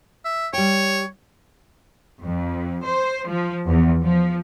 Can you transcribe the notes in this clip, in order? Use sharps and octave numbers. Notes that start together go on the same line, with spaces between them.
E5
G3 C#5 G5
F2
C5
F3
E2
F3